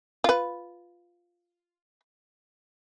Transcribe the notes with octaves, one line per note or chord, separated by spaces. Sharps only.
F4 B4